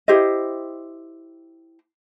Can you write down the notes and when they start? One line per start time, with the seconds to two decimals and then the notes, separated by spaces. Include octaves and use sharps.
0.08 E4 G4 C5 D#5